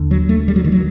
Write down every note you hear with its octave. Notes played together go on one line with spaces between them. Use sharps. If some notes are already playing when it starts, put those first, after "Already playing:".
Already playing: D#2 D3
F#3
A3
G3
F#3
D#3
F#3